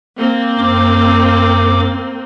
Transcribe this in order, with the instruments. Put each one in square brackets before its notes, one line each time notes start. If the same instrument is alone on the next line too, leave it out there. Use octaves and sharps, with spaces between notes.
[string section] A#3 C4
[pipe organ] F#2 D6